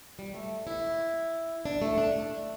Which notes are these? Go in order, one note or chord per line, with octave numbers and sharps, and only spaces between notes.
G3
A3
E4
D4
A3
D4